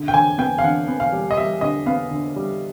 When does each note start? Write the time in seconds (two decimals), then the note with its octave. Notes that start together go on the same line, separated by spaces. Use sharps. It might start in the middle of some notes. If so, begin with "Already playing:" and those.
Already playing: D3
0.08 G5
0.14 D3 G#5
0.38 B3 G5
0.58 F5
0.64 D3 F#5
0.88 B3
1.00 F5
1.13 G3
1.31 D#5
1.37 G3 E5
1.61 D3 D#5
1.86 B3 F5
2.11 D3
2.36 G3